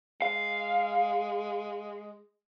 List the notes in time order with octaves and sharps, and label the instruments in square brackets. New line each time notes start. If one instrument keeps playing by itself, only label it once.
[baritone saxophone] G#3 [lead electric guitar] F5